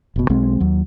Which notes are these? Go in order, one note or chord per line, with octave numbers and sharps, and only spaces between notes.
F1 B2
B1 G#3 C4
D#2 F#3